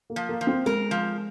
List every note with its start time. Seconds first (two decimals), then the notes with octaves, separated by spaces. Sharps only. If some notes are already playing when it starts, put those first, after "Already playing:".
0.10 A#3
0.16 F3
0.29 A#3
0.41 F3
0.47 C4
0.66 G#3 A#4
0.91 F3